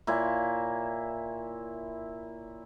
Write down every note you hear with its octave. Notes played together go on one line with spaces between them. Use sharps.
A#2 E4 C#5